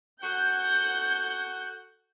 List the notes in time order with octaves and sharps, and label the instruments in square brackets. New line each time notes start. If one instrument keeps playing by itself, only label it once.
[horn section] F#4 A4 F#5 [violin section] G6